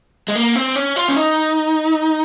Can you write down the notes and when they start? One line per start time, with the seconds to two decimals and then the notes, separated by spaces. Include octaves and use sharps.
0.28 G#3
0.35 A#3
0.55 C4
0.75 C#4
0.96 F4
1.08 C#4
1.16 D#4